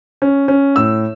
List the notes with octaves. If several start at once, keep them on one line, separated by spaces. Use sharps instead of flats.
C#4
C#4
A2 E6